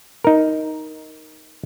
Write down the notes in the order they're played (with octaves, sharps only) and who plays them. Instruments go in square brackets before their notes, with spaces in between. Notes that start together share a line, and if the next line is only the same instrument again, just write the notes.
[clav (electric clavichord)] D#4 A#4